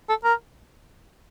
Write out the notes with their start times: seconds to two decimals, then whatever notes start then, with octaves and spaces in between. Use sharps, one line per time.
0.09 A4
0.24 A#4